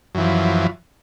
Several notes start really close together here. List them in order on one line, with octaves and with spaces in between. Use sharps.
F#2 E3 F3